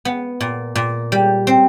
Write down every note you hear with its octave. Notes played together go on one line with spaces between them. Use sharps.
B3
A#2
A#2
G3
C4